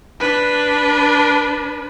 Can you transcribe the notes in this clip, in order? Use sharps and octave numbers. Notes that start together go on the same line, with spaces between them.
D4 B4